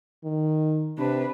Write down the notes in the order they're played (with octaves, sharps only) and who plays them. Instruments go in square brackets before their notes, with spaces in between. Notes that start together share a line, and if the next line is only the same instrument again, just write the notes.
[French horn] D#3
[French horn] C3 [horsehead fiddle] D4 B4